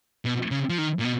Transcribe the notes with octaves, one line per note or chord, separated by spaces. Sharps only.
B2
C#3
F3
D#3
A#2
B2